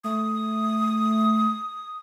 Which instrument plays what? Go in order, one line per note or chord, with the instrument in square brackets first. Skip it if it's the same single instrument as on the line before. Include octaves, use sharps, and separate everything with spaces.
[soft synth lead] A3 [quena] D#6